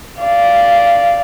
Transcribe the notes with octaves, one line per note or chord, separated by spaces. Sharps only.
D5 F5